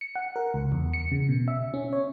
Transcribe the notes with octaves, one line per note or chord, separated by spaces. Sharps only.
C#7
F#5
A#4
C#2
E2
C#7
C#3
B2
E5
C#4
C#5